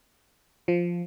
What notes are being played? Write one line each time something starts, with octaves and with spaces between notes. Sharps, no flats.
F3